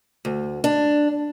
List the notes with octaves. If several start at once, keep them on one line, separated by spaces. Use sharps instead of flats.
D2
D4